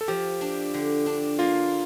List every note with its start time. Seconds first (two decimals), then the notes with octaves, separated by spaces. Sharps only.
0.01 A4
0.08 F3 G4
0.41 D4
0.74 D3
1.06 D4
1.39 A#3 F4